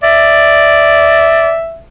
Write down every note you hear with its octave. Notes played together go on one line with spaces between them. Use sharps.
D5 E5